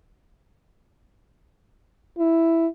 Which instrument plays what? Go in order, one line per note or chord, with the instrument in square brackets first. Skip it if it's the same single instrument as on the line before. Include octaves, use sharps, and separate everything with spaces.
[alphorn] E4